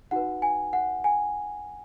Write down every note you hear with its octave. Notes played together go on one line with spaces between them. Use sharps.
D#4 F#4 B4 F#5
G#5
F#5
G#5